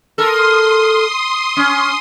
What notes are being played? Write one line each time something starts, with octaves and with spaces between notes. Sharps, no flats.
A4 A#4 C6 D#6
C#4